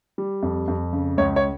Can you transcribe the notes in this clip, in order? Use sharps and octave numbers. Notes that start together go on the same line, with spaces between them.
G3
F2
F2
C#3
C#2 C#5
C#5